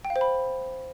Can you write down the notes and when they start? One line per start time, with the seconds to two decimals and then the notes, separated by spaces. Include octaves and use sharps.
0.05 G5
0.10 F5
0.16 C5
0.21 B5